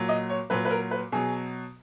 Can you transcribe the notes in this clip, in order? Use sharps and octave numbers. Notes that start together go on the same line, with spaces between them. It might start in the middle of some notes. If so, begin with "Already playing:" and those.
Already playing: A#2 F#3
D#5
C#5
A#2 F#3 B4
B4
A#4
B4
B2 F#3 G#4